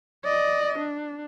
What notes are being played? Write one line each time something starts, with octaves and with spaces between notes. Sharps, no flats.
D5 D#5
D4